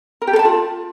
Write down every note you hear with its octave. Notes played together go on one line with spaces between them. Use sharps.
A#4
G4
A4
A5
F4